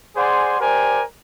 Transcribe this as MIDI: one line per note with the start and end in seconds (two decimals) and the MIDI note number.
0.16 0.57 68
0.16 0.57 72
0.16 0.57 74
0.16 0.57 78
0.16 0.57 80
0.16 0.57 84
0.60 1.03 67
0.60 1.03 70
0.60 1.03 72
0.60 1.03 74
0.60 1.03 80